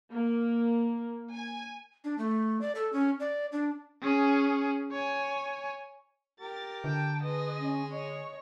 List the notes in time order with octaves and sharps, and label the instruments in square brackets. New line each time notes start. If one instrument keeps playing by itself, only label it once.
[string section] A#3
G#5
[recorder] D4
A3
D5
A4
C#4
D5
D4
[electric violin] C#4 G#4
C#5 G#5
[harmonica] G4 A#4 [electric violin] A6
[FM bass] D3 [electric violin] G5 A5
[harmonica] G#3 [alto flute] B4 [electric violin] D#5
[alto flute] C#4
[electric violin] C#5 [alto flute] D#5